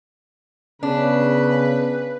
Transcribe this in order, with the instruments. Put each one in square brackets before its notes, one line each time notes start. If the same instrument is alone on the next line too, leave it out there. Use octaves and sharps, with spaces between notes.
[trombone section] C#3 [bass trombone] B3 [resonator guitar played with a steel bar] D4 [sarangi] B4